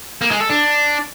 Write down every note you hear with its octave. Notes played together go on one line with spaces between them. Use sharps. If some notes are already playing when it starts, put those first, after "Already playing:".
A#3
G#3
A4
D4